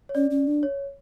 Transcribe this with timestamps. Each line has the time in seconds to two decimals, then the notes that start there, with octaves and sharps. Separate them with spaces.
0.09 C#5
0.15 C#4 D5
0.31 C#4
0.47 D4
0.63 C#5